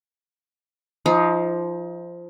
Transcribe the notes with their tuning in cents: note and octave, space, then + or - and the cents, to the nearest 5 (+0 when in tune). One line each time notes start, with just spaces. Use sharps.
F3 -10 D#4 +25